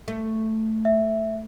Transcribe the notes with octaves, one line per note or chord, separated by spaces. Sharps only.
A3
E5